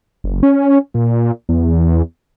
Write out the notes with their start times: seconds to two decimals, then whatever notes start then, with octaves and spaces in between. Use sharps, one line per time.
0.24 F#1
0.43 C#4
0.94 A#2
1.49 E2